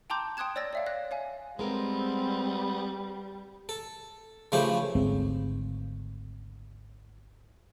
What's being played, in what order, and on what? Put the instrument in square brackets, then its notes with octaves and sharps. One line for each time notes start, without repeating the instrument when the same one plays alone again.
[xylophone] G5 A5 A#5 C6 D6 G6
G5 C6 D#6 F#6 G#6 E7
C#5 D5 G5 E6 A6 A#6
D5 E5 F5
C#5 F5 F#6 A#6
C#5 F5 G#5
[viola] G3 [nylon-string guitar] G#3 A#4 [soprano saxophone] B3 [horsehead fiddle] C4
[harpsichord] A4
C#3 E3 F3 A3 G4 B5
[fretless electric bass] G#1 D2 G#2 C4